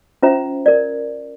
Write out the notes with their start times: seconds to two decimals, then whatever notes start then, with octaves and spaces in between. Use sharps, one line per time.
0.23 C#4 F4 C5 E5 A#5
0.66 A#4 D5